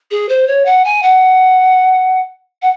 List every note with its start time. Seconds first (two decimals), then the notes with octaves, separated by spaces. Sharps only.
0.10 G#4
0.28 C5
0.47 C#5
0.65 F#5
0.84 G#5
1.02 F#5
2.62 F#5